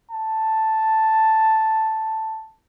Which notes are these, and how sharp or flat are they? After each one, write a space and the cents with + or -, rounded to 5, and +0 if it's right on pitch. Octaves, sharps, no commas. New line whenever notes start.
A5 +0